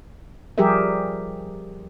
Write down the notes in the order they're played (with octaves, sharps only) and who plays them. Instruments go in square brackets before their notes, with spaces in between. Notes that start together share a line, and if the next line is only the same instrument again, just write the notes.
[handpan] F3 G3 G4 G#4 A#4 E5